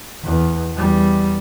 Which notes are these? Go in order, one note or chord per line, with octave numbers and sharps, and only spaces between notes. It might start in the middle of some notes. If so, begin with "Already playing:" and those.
E2
E2 G3